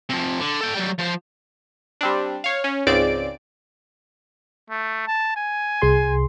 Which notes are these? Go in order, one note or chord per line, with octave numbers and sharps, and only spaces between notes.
C3 F3
D3
A4 G5
F#3 G3
F3 C5
G3 C4 D4
C#5 F5
C#4
C#2 G#2 C#3 C4 D5 D7
A3
A5
G#5
C2 G#4 C6